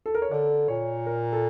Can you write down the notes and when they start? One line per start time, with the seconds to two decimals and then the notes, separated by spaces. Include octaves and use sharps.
0.06 A4
0.14 A#4
0.22 C#5
0.31 D3 D5
0.68 A#2 C#5
1.06 A#4
1.33 A4